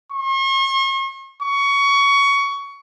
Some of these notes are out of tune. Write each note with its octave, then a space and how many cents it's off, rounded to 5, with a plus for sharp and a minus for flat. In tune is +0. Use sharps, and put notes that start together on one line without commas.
C#6 -45
C#6 +20